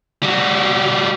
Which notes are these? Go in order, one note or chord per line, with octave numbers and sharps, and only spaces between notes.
G3 F#4